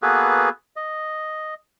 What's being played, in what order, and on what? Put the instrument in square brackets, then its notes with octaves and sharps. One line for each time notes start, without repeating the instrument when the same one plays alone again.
[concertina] A#3 B3 F#4 G#4 A4 B4
D#5